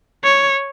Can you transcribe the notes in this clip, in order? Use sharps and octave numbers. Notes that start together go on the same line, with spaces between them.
C#5